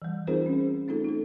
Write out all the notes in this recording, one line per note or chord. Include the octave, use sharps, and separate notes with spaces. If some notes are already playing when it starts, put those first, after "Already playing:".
E3 G3
C4 D#4 F4 G#4 A#4 C5
C#4
A3 C4 D#4 F4 A4
D#4 A4